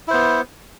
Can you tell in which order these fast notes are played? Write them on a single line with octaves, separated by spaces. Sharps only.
E4 C5 B3